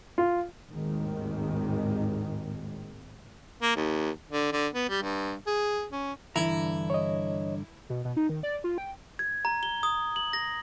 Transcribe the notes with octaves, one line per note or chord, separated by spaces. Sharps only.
F4
G#1 D#2 A2 D#3 G#3
A#3
D#2
D3
D3
B3
G3
G2
G#4
C#4
G2 D3 E3 E4 A#5
C#5 D#5
B2
B2
D#4
D#3
D5
F4
G5
G#6
A#5
G7
D#6
F#7
A#6